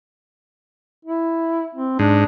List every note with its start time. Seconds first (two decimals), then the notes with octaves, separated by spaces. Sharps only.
1.05 E4
1.75 C4
1.99 G#2 D4